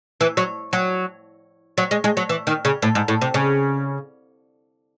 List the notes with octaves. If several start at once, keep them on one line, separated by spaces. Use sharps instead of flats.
E3
F#3
F#3
F#3
G#3
G#3
F#3
E3
D#3
C#3
A2
G#2
A2
C3
C#3